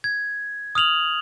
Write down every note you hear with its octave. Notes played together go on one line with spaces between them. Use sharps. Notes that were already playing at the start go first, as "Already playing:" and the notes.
G#6
D#6 F6 F7 F#7